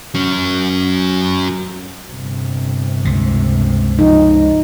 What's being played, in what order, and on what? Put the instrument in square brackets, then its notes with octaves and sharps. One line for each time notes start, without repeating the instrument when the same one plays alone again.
[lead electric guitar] F#3 C#4
[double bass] G1 C3
[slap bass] C#2 D3
[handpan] F3 D#4